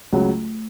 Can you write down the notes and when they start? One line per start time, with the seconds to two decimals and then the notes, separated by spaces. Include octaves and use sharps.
0.13 C#2 C#3 F#3 A3